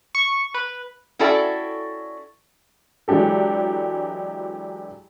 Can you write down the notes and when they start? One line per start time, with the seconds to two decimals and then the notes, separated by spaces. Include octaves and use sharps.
0.15 C#6
0.54 B4
1.19 C#4 E4 F#4 A4 D5 G5
3.08 E3 F#3 G#3 D4 G4 A4